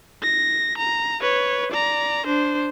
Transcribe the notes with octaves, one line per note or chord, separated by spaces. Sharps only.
A#6
A#5
B4 C#5
D5 A#5
D4 C5